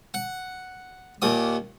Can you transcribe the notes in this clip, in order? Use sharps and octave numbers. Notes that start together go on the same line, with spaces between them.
F#5
D#2 A#2 D#6